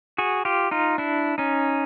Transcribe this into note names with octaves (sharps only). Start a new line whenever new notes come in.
F#4 G#4
F4 G4
D#4 F4
D4 E4
C#4 D#4